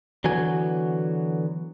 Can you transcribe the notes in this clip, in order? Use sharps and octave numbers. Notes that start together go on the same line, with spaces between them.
D3 E3 F#3 B3 F#4 G#5